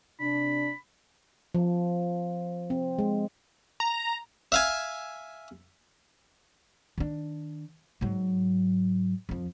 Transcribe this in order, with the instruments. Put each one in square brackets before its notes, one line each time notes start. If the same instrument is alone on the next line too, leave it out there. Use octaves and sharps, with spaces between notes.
[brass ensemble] C3 D4 [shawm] B5
[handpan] F3
C4
G#3
[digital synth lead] A#5
[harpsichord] E5 F5 G#5
[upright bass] D#3 D4
G#2 F#3
F2 F3